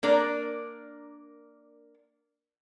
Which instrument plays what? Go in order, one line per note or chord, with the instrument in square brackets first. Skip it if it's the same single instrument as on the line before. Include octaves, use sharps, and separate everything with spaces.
[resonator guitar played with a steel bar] A#3 D4 A#4 D5